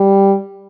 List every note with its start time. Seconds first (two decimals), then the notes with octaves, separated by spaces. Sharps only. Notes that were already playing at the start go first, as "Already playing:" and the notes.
Already playing: G3